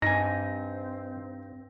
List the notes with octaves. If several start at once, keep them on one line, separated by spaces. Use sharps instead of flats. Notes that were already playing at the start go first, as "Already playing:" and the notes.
G2 C4 D#4 G#5 A#6